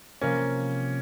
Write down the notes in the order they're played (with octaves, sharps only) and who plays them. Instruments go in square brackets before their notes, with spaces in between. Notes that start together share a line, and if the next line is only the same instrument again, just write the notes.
[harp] C3 F3 C4 [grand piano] A#3 C#4